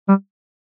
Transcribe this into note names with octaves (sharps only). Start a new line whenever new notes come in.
G3